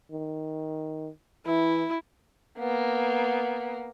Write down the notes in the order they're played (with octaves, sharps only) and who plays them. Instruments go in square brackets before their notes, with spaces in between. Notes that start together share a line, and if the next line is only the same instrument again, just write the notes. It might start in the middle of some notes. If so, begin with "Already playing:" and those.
[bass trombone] D#3
[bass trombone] E3 [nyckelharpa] E4
[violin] A#3 B3